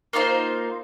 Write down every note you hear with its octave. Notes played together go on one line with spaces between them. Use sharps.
A#3 D#4 F4 C5